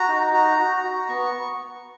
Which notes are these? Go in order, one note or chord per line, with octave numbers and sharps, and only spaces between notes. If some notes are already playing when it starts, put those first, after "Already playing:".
Already playing: F#4 A#5
D#4
F#4 A#5
F#4
F#4
B3 C#6